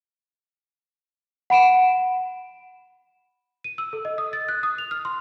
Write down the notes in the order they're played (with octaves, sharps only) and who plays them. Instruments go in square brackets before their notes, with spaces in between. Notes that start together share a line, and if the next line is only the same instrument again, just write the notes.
[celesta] F#5 B5 D7 E7
D#7
E6
A4
D#5
D#6
A6
F#6
D#6
F7
F6
C6